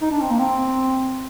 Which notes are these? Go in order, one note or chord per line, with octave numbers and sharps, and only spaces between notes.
D#4
D4
C4
A#3
C4